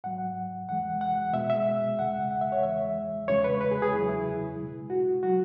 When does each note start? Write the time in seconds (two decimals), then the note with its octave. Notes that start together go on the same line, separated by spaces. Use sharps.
0.04 G#2 F#3 F#5
0.69 E2 E3 G#3 F#5
1.01 F#5
1.33 B2 G#3 E5
1.50 E5
1.98 E2 C#3 G#3 F#5
2.31 F#5
2.41 E5
2.52 C#5
2.63 E2 E3 G#3 E5
3.28 E2 C#3 G#3 C#5
3.44 B4
3.61 B4
3.71 G#4
3.82 G#4
3.93 E2 C#3 F#3 E4
4.09 E4
4.58 B2 G#3
4.90 F#4
5.23 F#3 F#4